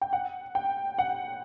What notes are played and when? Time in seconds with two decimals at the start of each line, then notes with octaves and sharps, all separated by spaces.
0.02 G5
0.13 F#5
0.55 G5
0.98 F#5